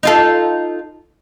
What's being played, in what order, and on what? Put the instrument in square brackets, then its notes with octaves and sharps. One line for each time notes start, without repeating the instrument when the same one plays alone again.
[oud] D#4 F4 A4